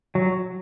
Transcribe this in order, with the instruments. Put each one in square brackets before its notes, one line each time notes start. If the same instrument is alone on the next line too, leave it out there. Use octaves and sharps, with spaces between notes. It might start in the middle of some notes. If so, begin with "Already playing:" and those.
[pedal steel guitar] F#3